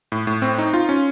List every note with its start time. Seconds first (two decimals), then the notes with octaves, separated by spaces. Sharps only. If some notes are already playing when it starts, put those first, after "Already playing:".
0.12 A2
0.27 A2
0.42 C4
0.58 D#4
0.74 F4
0.89 C#4